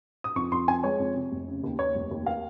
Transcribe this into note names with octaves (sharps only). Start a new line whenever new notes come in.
D#6
F2 C#6
F2 C6
F2 G#5
G#3 C#5
F2
C3
F1
C#3
D#2
D#2 C#5
F1
D#2
A#3 F5